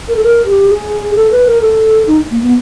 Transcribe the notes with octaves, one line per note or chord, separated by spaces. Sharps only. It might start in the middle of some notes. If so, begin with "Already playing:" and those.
A#4
A4
A#4
G4
G#4
A4
B4
A#4
A4
D#4
A#3
B3